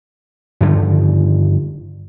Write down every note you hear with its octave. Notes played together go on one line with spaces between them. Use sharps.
G2 D3 D#3 F3